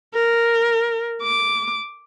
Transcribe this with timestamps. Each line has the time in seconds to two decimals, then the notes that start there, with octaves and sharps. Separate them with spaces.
0.14 A#4
1.23 D6